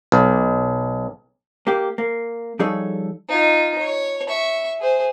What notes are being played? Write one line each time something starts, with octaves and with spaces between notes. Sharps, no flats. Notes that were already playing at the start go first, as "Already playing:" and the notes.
B1
A#3 G4
A#3
F3 G3 D#4 G#4 A4 C#5
D#4 F4
C#5
E5 C#6
G#4 C5